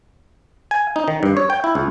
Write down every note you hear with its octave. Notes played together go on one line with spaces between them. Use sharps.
G#5
D#4
D#3
G2
C#5
G5
E4
C#2